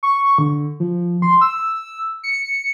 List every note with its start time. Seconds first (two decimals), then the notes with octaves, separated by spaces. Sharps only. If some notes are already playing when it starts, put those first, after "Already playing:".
0.03 C#6
0.38 D3
0.80 F3
1.22 C6
1.41 E6
2.23 C#7